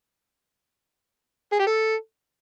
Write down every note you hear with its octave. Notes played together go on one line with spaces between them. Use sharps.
G#4
G4
A4